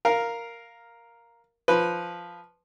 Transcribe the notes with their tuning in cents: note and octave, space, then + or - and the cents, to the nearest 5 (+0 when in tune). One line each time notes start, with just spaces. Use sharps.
A#4 +0 F5 +0
F3 +0 B4 +0